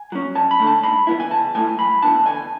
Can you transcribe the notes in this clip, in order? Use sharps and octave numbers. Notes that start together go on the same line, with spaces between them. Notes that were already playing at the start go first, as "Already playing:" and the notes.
Already playing: G#5
F#3 C#4
F#2 A5
B5
D3 A3
A5
G#2 B5
E3 B3 E4
G#5
C#3 A5
E3 A3 E4 G#5
F#2 B5
E3 B3 D4 A5
D2 G#5